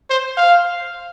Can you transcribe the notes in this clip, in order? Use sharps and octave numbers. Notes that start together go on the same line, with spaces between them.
C5
F5